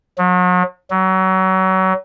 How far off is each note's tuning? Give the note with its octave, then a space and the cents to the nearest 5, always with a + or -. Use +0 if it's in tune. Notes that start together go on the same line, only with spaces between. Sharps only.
F#3 -40
F#3 +30